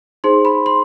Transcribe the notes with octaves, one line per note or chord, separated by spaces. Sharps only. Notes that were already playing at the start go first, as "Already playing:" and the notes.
D#4 G#4 C5 C6
B5
C6